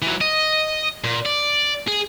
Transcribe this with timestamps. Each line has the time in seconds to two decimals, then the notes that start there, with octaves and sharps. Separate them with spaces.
0.02 E3 F#3
0.21 D#5
1.04 A#2
1.26 D5
1.87 G#4